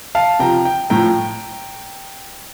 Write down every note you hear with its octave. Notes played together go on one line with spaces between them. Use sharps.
F5 A5
C3 F3 G5 A#5
G5
A2 F3 G5 A#5